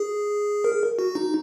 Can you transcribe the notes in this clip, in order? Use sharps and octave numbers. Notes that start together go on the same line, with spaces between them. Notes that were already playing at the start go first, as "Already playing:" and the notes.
Already playing: G#4
A#4
F#4
D#4